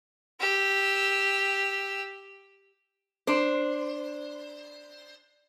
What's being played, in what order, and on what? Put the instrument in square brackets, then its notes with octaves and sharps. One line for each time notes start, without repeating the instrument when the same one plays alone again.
[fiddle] G4 E6
[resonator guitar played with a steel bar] D4 C5